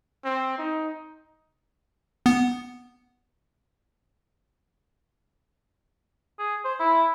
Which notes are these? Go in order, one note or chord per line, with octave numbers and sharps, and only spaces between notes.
C4
D#4
B3
G#4
C5
E4